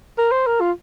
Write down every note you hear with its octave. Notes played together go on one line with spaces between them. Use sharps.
A#4
C5
A#4
F4